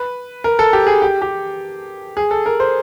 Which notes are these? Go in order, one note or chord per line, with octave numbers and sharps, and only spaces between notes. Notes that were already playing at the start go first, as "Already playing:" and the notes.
Already playing: B4
A#4
A4
G4
G#4
G4
G4
G#4
A4
A#4
C5